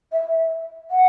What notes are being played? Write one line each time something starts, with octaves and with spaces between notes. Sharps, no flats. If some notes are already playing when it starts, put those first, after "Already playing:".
E5
F#5